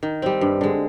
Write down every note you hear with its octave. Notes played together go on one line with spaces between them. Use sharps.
D#3
G3 C4
G2
D3 G#3